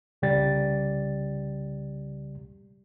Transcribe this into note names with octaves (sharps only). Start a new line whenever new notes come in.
C2 C#3 G3 G4 D5 A6